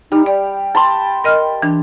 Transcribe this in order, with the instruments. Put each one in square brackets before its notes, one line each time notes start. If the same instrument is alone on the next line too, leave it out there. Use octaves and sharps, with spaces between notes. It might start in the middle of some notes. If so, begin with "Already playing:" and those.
[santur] G3 [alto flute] D#4
[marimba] D5 [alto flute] G5
[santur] A5 B5 C6
[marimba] A#4 D#5 F6
E3 D4